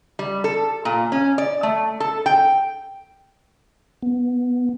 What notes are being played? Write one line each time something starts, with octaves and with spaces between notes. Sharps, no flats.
G3
A4
A#2
C#4
D5
A3
A4
G5
B3